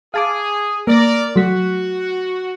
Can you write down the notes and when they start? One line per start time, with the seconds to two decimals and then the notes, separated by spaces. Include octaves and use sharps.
0.14 G#4 F5 A5 D6
0.87 A#3 A#4 D5 A#6
1.36 F#3 A3 F#4 B6